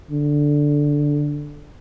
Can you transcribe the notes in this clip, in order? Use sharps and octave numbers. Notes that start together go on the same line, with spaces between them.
D3